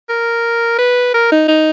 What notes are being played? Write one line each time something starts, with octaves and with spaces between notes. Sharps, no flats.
A#4
B4
A#4
D#4
D#4